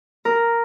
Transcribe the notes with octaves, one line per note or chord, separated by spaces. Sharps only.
A#4